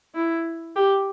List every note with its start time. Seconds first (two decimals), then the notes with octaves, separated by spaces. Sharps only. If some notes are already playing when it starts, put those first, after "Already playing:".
0.15 E4
0.76 G4